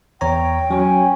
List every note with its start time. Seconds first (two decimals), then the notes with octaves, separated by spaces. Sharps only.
0.21 E2 C#5 G5 A#5
0.71 F#3 C#4